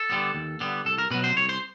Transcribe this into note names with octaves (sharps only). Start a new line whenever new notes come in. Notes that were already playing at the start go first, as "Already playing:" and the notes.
Already playing: A4
D3 G3 B3
D#2
D3 G3 B3
C2 A4
A#4
B2 F#3 B4
C5
C2 C#5
C5